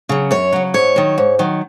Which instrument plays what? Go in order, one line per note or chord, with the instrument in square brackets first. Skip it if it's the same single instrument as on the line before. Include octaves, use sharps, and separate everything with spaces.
[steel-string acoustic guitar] C#3 F#3
F#2 C#5
C#3 F#3
G#2 C#5
D#3 F#3
G#2
D#3 F#3